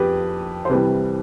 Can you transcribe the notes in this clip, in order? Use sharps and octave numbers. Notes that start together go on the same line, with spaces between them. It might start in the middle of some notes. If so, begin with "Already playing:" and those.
Already playing: F2 G4 B4
C5
C2 C3 E3 G3 G4 B4